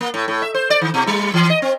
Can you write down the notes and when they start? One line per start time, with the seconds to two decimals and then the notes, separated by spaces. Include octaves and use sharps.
0.01 A#3
0.14 A2
0.28 A2
0.42 E5
0.54 C5
0.70 D5
0.81 D#3
0.94 B2
1.07 G3
1.34 E3
1.50 D#5
1.62 C4